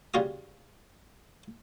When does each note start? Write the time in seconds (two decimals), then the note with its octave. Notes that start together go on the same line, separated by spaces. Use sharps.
0.14 C#3 G3 F4 F#4 D#6